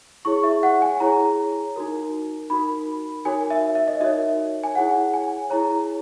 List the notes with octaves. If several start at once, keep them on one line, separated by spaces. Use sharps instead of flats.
E4 G#4 C#5 C#6
E5
F#5
G#5
E4 G#4 C#5 A#5
D#4 F#4 A#4
D#4 F#4 A#4 B5
D#4 F#4 A#4 C#5 G#5
E5
E5
D#5
D#4 F#4 A#4 C#5 E5
G#5
E4 G#4 C#5 F#5
G#5
E4 G#4 C#5 A#5